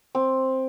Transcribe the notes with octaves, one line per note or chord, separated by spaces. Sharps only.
C4